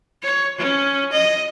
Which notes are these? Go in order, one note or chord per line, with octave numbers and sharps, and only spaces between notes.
C#5
C#4
D#5